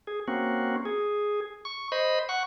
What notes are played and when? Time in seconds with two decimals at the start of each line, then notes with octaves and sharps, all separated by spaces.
0.07 G#4
0.28 A#3 C4 C#4 F#4
0.85 G#4
1.65 C#6
1.92 C5 D#5 B5
2.29 F#5 C#6